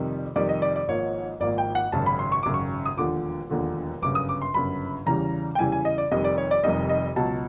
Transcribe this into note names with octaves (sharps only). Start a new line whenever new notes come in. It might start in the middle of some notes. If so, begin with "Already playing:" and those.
Already playing: F2 C3 D#3 G3
F2 C3 D#3 G3 D5
D#5
D5
D5
G#1 G#2 F3 A#3 C#5
G#1 G#2 F3 A#3 D5
G5
F#5
G#1 F#2 C#3 A5
B5
C6
C#6
G#1 F#2 C#3 D6
C#6
D#6
E1 D#2 D3 F3 D6
E1 D#2 D3 F3
G1 F#2 C#3 D6
D#6
D6
C6
G1 F#2 C#3 B5
E2 C#3 E3 G3 A#5
G5
E2 C#3 E3 G3 G#5
G#5
D#5
D5
F1 F2 C3 D#3 G3 D#5
D5
C#5
D5
F1 F2 C3 D#3 G3 D#5
D#5
C#2 B2 F#3 A5